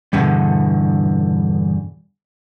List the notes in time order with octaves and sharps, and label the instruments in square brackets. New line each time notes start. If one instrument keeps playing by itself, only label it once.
[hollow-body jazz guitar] E2 G2 B2 D3